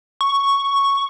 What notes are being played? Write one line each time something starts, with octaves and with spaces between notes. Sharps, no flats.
C#6